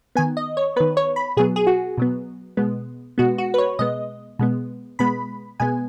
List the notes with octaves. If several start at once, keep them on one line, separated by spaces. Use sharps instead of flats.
D#3 B3 G#5
D#5
C#5
D#3 B3 B4
C#5
B5
B2 F#3 B3 G#4
G#4
F#4
B2 F#3 B3
B2 G#3 B3
B2 G#3 B3 F#4
F#4
B4
C#5
B2 G#3 B3 D#5
B2 G#3 B3
B2 G#3 B3 B5
B2 G#3 B3 G#5